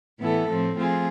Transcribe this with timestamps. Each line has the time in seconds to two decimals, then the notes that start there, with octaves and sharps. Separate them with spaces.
0.19 A2 E3 B3 E4 A4
0.48 A2 F3 A3 C4
0.77 F3 A3 C4 F4 G#4